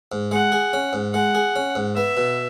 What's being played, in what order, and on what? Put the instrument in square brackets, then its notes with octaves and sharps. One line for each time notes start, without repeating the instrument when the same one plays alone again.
[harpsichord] G#2
[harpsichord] G#3 [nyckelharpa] F#5
[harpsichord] G#4
C#4
G#2
[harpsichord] G#3 [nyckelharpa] F#5
[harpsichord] G#4
C#4
G#2
[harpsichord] B3 [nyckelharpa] E5
[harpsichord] B2